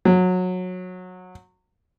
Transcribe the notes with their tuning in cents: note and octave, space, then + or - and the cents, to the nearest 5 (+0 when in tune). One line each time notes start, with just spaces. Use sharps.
F#3 -20